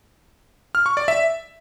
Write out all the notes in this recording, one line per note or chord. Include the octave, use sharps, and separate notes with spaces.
F6
C#6
D5
E5